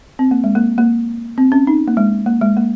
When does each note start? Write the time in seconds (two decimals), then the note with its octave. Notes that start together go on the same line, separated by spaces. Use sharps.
0.19 C4
0.31 A#3
0.44 G#3
0.55 A#3
0.78 A#3
1.38 C4
1.52 C#4
1.67 D#4
1.88 A#3
1.97 G#3
2.26 A#3
2.41 G#3
2.57 A#3